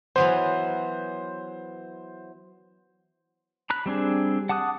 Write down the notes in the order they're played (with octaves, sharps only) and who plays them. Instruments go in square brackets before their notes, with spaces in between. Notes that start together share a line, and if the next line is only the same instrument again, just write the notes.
[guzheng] E3 F#3 B3 [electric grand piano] C5
[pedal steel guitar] A#5 B5 F#6
G3 C4 D4 G#4
F#5 A5 D6 D#6 F#6